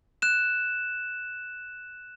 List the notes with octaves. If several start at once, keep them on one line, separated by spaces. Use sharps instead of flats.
F#6 E7